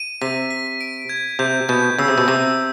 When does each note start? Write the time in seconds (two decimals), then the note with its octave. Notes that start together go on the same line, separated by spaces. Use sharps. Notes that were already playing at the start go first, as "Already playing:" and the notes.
Already playing: D#7
0.21 C3 B6
0.51 B6
0.81 D7
1.09 G#6
1.39 C3 G6
1.69 B2 G6
1.98 C#3 E6
2.08 C3
2.18 B2
2.28 C3 E6